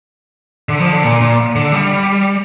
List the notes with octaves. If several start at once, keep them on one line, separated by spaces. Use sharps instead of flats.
D3
F3
D3
A#2
A#2
D3
G3